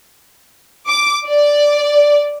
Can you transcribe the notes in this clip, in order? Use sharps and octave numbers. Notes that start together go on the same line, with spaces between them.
D6
D5